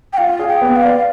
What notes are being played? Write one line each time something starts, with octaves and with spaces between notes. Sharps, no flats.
G5
F4 F5
G#4
G5
B3
F5
D5